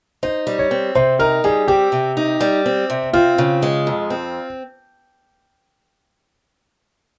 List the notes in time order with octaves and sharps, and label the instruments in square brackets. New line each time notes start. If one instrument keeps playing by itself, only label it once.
[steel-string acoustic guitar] D#4 [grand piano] C5
[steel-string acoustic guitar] G3
[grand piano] C#5
[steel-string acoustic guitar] C4
[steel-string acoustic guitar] C3 [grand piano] C5
[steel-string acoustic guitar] D#4 [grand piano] A#4
[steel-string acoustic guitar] G3 [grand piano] G#4
[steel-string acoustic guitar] C4 [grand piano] G4
[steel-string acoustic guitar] C3
D#4
G3
C4
C3
[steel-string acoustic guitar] C4 [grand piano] F4
[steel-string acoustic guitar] C#3
G#3
F2
C4